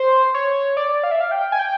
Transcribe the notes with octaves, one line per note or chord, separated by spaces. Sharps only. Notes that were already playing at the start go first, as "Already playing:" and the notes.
Already playing: C5
C#5
D5
F5
E5
F5
G5
G#5
G5